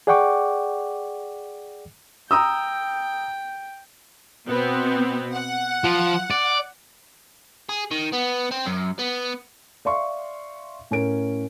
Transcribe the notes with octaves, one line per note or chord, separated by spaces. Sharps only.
G#4 D5 F#5 G5 C#6 D6
G5 A#5 D#6 E6
B2 B3 C4
F#5
F3 F4
D5
G#4
D#3
B3
C4
F#2
B3
D5 E5 F5 C6 C#6
A2 C#4 A#4 D7